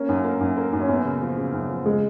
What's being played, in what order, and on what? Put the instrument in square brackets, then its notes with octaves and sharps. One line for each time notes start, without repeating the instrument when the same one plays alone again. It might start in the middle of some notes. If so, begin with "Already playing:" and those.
Already playing: [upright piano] A#3 [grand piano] C#4
[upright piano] F#2
A#3
F#2
A#3
F#2
[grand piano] C#4
[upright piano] F#2 [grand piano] B3
[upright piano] C#3
F3
C#3
F#2
F3
[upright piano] C#3 [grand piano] G#3